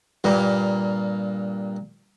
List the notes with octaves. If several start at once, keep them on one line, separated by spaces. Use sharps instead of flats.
G2 A#2 A#3